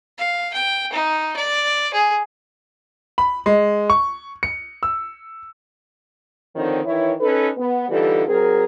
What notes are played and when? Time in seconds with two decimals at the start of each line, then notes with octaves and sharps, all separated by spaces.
0.18 F5
0.53 G5
0.92 D#4
1.36 D5
1.93 G#4
3.18 B5
3.46 G#3
3.90 C#6
4.43 C#7
4.83 E6
6.56 D3 D#3 F3 C4 D#4 C#5
6.85 D#3 E3 E4 C#5
7.20 C#4 D#4 A4 B4
7.57 B3
7.89 D3 E3 G3 D#4 F4 A4
8.28 F#3 C4 G#4 A#4